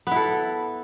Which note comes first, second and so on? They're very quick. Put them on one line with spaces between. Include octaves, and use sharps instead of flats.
B3 E4 A4